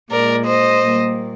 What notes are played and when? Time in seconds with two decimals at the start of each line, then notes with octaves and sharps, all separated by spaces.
0.10 A#2 G#3 A#4 D5
0.46 C5 D#5
0.81 A#2 G3 A#3